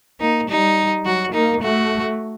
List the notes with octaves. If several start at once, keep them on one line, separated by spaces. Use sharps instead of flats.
A#3 D#4
G3 D#4
F#3 F#4
A#3 D#4
A3 F#4